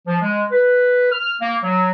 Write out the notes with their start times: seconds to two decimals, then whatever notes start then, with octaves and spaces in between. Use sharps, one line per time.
0.08 F3
0.22 G#3
0.52 B4
1.12 F6
1.42 A#3
1.64 F#3